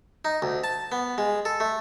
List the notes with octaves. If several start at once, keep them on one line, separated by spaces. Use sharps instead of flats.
D#4
D2
A5
B3
G#3
A4
A3